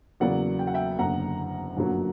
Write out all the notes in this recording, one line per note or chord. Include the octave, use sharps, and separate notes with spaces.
E2 C#3 F#3 A#3 D5 F#5
G5
F#5
E5 G5
F#1 F#2 D3 F#5 A#5
G1 F#2 D3 F#3 A#3